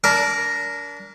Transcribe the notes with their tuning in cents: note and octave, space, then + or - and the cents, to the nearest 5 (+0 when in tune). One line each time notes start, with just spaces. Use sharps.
D4 -30 A#4 +0